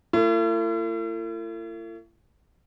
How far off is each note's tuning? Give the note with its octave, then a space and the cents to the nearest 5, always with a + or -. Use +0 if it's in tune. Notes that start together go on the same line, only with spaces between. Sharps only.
A3 +45 E4 +45